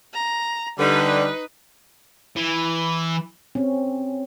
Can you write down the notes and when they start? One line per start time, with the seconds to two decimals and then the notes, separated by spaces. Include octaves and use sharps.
0.14 A#5
0.79 D3 G3 D#4 B4
2.36 E3
3.55 C4 C#4